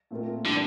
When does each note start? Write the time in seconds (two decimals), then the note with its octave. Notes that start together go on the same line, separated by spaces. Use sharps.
0.11 A#2 A3 C4 F4 A#4
0.45 D3 E3 G3 D4